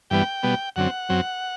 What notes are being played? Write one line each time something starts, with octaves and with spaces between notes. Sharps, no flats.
G2 E3 G3 B3 G5
B2 G3 B3
F#2 D3 F#3 C4 F#5
F#2 F#3 C4